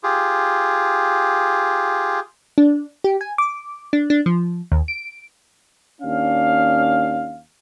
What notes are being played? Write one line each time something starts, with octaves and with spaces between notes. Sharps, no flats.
F4 G4 G#4
D4
G4
G#5
D6
D4
D4
F3
D#2
D7
D#2 C#4 D4 F5